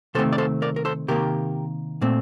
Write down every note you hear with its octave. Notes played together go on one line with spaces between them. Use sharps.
C3 D#3 A3 C4 A4 C5
D5
A4 C5
A#4 D5
A#4
A4 C5
C3 D#3 A#3 G4 A#4
A#2 A3 C4